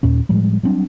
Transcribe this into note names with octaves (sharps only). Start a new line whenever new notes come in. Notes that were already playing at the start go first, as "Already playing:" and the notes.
D#2 A#2 C#4
A2 F3 G3 G#3
F#3 G3 C4 D4